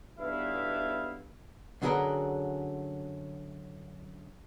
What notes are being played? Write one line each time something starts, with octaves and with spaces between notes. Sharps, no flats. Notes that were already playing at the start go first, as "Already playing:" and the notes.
B1 G2 B3 E4 E5 F5
F#2 D3 F#3 G#4 A#4 B4